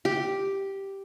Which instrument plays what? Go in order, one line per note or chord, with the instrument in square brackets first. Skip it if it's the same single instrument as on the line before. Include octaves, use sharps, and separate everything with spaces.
[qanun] G4